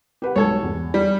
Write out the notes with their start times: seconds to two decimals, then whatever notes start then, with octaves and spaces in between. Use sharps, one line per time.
0.22 G4 B4 F#5
0.36 B1 G#2 A4 C#5 G#6
0.63 E2
0.94 G3